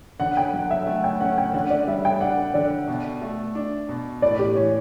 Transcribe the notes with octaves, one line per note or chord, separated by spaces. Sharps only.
D3 F#5
G5
F#3 F#5
E5
A3 F#5
G5
C#4 F#5
G5
D3 F#5
D5
G3 E5
G5
D4 F#5
D3 D5
B2
A3
D4
B2
A2 D5
G4
E3 C#5